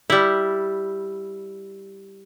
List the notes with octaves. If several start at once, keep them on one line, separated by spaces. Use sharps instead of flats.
G3 E4